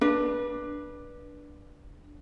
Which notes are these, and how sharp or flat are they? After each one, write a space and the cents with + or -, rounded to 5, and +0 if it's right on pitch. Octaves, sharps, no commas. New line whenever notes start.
D4 +0 B4 -25